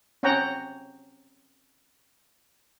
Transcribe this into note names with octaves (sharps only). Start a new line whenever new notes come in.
C4 C#4 C#5 F#5 G5 A#5